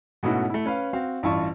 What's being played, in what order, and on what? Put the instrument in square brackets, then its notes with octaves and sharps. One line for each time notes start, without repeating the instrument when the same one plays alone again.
[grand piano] G#2 B2 A3 C#4 E4 F#4
A3 E4
C#4 B4 F5
C4 F#4 F5
A1 G2 E4 F4 A5 C#6